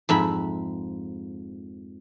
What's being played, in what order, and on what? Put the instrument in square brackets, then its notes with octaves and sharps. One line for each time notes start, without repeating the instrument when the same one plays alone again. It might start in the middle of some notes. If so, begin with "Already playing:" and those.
[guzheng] F2 G#2 E5 B5